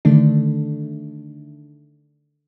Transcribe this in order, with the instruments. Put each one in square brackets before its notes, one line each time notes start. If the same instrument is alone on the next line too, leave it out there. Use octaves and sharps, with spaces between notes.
[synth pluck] D3 D#3 A3 D4